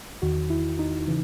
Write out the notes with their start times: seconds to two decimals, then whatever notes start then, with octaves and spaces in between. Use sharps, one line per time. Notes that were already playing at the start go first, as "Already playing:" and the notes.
0.22 E2 D#3 F#4
0.50 E4
0.79 D#4
1.07 C#3 E3